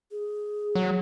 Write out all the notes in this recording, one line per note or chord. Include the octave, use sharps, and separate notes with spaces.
G#4
F#3